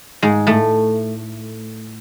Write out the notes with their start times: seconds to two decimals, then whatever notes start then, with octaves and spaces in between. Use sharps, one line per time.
0.22 G#2 G#3
0.47 A2 A3